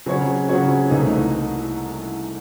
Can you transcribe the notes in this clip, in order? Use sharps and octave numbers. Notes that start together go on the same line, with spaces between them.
C#3 F#3 C4 F#4 C#5
C#3 F#3 C4 F#4 C#5
C2 C3 E3 A3 D#4